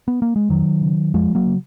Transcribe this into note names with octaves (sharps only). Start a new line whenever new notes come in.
B3
A#3
G#3
F2 D#3 F#3
C#3
F2 F3 G#3
F#3 A#3
C#3